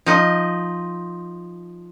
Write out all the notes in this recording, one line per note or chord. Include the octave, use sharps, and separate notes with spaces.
F3 D#4